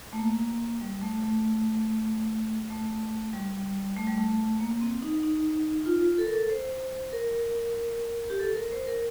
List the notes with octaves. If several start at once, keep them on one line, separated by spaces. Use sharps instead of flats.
A3
A#3
G3
A3
A3
A3
G3
G3
A3
G3
A3
A#3
A#3
C4
D#4
D#4
D#4
F4
A4
A#4
A4
C5
A#4
G4
A4
A#4
C5
A#4